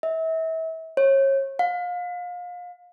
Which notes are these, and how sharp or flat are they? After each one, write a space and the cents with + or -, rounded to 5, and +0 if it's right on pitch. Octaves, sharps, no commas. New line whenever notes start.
E5 -35
C#5 -30
F5 +30